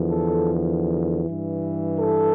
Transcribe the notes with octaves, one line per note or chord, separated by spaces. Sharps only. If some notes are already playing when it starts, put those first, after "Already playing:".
Already playing: E2 D3 F3
A4
G2 E3
A4